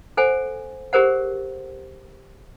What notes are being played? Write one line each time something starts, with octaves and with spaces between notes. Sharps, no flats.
A4 C5 F#5 G#5
G4 G#4 A#4 C5 F#5